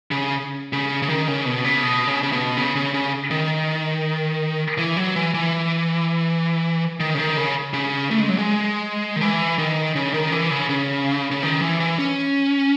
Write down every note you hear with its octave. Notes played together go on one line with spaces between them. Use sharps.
C#3
C#3
C#3
D#3
C#3
B2
C#3
B2
C#3
C#3
B2
C#3
C#3
C#3
D#3
E3
F#3
E3
E3
D#3
C#3
D#3
C#3
C#3
A3
G#3
F#3
G#3
D#3
E3
D#3
C#3
D#3
E3
C#3
C#3
C#3
D#3
E3
E3
C#4